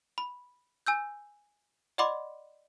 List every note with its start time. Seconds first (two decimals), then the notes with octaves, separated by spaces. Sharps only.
0.18 B5
0.87 G#5 E6 G6
1.98 D5 D#5 F#5 B5 C6 D6